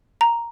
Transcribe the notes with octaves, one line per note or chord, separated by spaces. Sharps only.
A#5